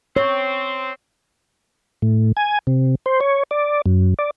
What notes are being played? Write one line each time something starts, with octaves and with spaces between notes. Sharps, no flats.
C4 C#5
A2
G#5
C3
C5
C#5
D5
F#2
D5